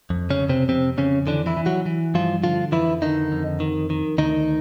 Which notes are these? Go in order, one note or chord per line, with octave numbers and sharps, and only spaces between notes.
F2
C#3 C#4
F2
C3 C4
F2 C3 C4
F2 C#3 C#4
D3 E3 D4
E3 E4
E3
F#3 F#4
E3
G2 F3 F4
D3 F3 F4
F2 E3 E4
D3 D#3 D#4
F2
D#3
D#3
D2 D#3 D#4